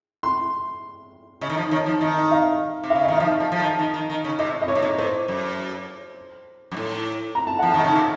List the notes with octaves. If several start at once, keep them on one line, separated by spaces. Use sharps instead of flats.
C6
C#3 D#5
D#3
F3
D#3 C#5
F3
D#3 D#5
F5
C3
F5
C#3
D#3 D#5
F3 F5
F3
F3
D#3
D#3
D#3
D#3
C#3
C3 D#5
D#5
A#2 C#5
C3
A#2
A2 C5
F#2
F#2
A2
A#5
A5
F3 F#5
D#3 A5
C#3
C3